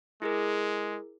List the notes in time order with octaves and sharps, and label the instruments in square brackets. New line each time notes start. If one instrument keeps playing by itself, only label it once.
[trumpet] G#3 [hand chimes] E4 G#4 A#4